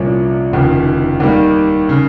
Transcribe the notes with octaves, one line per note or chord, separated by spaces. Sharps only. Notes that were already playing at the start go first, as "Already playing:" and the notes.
Already playing: C2 A#2 F3 A#3 C#4
F1 D#2 C#3 F3
D#2 D#3 G3 A#3
C#3